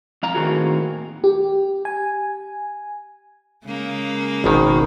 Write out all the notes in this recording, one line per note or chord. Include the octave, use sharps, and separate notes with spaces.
F2 F5 A#5
A2 D#3 A#3 C4 F#4 G#4
G4
G#5
C#3 G#3 A#3
G#1 B2 D#3